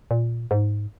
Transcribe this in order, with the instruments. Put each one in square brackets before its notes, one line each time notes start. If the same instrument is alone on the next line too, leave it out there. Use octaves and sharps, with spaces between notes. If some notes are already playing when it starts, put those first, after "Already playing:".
[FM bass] A#2
G#2